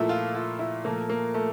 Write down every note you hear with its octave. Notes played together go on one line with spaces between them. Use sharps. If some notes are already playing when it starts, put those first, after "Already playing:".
Already playing: A#2 F3 A3 E4
F4
F4
E4
A#2 F3 A3 A#3
A#3
A3